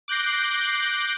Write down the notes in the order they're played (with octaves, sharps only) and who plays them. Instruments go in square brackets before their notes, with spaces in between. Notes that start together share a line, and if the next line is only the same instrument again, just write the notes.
[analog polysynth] D6 F#6 G6 A#6 C7